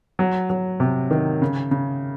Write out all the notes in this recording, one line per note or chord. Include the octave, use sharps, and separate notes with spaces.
F#3
F#3
C3
D#3
C#3
C#3